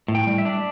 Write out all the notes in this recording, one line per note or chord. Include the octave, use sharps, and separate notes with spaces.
A2
G5
G3
E5
D4